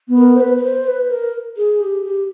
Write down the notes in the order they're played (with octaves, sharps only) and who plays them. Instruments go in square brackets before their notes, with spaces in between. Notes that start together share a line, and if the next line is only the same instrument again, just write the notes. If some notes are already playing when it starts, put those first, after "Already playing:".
[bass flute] B3
[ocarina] A#4
C5
B4
B4
C5
B4
A#4
G#4
G4
G4